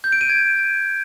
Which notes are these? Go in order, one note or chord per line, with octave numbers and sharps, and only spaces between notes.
G6
D7
D#7
G#6